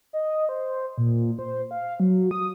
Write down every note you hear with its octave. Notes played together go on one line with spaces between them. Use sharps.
D#5
C5
A#2
C5
F5
F#3
D#6